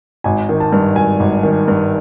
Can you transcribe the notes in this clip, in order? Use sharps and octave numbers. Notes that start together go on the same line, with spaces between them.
G#1 G#5
D#3
A5
G2
G#1 G#5
G#1
D#3
G2